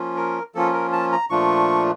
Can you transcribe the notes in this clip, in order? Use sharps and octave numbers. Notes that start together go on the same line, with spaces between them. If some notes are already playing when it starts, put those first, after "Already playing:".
Already playing: F3 A#3 C#4 F4
A#4
F3 A#3 C#4 F4 A4
A#4
A5
A#5
A#2 F3 A3 D4 F4 C#6